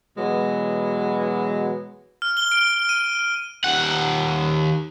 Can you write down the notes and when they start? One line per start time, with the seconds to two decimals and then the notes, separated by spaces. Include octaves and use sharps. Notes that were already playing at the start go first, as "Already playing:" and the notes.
0.17 B2 E3 F#3 G#3 B3
2.22 F6
2.37 G7
2.52 D7
2.89 D#7
3.64 D#2 F#5